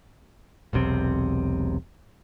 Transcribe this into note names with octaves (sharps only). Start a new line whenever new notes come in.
E1 B1 C3 C4